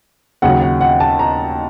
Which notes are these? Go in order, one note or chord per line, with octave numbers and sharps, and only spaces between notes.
D#2 C#3 F#3 F#5
F#5
F#5
A5
A#5